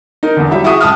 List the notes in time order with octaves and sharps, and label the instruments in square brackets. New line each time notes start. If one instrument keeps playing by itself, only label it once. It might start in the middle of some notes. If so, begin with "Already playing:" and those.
[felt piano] D#4 A#4
E2 D3
E3 F#3 G3 E5
E4 F#4 G#4 E5 D#6
C#2 A5 D#6 F6